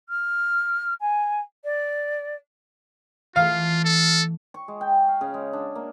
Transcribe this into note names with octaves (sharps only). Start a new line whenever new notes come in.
F6
G#5
D5
E3 A3 F4 F5
A4
C#6
G#3
G5
F5
C#3
G#3
D4
A#3